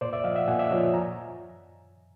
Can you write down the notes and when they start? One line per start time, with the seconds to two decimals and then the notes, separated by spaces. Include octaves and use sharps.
0.01 A#2 C5 D5
0.13 D5 E5
0.24 F3 D#5 F5
0.35 E5 F#5
0.47 A#2 F#5 G#5
0.59 D5 E5
0.70 F3 C#5 D#5
0.94 G#5 A#5